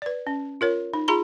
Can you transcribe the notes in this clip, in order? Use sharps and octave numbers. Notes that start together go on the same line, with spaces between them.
B4 D5
C#4
F4 A#4 C#5
D#4
F4 G#4 A#5 B5